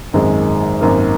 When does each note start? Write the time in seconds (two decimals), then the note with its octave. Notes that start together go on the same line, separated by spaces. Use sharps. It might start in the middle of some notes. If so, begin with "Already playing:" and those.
0.13 G#1 F#2 D#3 G#3
0.81 G#1 F#2 D#3 A#3